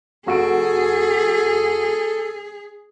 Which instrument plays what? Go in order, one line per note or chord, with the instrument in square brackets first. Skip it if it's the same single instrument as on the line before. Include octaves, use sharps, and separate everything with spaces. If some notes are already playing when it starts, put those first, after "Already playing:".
[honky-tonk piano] F1 F#4 D7 [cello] G#4 [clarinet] A4